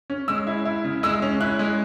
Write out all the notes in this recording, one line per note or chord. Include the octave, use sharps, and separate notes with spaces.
C#4
G#3 E6
E4
E4
C#3
G#3 E6
C#4
E4 F#6
G#3